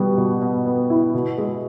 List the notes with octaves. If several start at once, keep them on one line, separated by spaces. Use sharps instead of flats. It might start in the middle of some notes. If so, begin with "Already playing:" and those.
Already playing: B2 G3 B3
B2
B2
B3
E4
B2
G#3